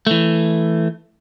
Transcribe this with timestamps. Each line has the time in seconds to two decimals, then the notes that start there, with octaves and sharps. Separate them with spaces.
0.07 E3 A3